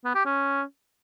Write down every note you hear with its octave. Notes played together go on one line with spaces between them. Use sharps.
B3
G4
C#4